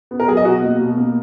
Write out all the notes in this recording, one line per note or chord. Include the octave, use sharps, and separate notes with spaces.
B3
A#4
F#3 G#4
D#5
B2 F#4
A#3
B2
A#3